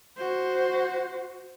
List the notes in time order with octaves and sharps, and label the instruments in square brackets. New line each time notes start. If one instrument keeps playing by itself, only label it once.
[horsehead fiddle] F#4 C5